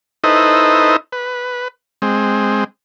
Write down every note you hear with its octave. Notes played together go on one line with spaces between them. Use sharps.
D#4 E4 A4 B4 C5 D#5
B4
G#3 C4